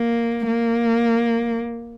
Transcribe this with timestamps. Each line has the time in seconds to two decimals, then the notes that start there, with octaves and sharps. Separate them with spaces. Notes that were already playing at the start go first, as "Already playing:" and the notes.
Already playing: A#3
0.48 A#3